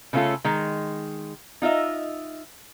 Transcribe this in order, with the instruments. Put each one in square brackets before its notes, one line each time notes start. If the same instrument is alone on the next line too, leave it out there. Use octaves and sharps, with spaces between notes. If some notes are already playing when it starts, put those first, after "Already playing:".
[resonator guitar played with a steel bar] C#3 A3 B3 C#4 F4 A4
D#3 G#3
D#4 F4 D#5 E5